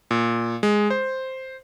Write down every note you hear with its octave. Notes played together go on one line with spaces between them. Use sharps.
A#2
G#3
C5